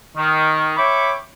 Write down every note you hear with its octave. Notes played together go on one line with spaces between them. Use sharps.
D#3
C#5 E5 G5 B5 C#6 D6